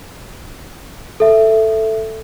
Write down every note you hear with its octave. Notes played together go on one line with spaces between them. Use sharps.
A4 E5